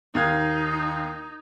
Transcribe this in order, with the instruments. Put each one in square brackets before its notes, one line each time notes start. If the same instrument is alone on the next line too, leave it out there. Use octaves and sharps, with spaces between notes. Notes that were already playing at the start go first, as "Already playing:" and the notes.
[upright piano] D#2 F5 G#6 [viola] D#4